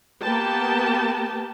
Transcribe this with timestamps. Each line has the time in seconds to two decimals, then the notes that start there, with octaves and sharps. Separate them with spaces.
0.22 A#3 B3 G4 B4 G5 A5